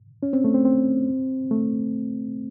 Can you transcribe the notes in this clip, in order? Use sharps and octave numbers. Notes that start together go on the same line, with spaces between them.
C#4
C4
A3
C4
C4
A3